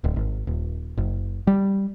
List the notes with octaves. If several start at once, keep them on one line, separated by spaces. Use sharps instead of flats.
D1
G#1
D#1
F#1
G3